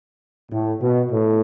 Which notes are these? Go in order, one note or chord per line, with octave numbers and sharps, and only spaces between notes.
A2
B2
A2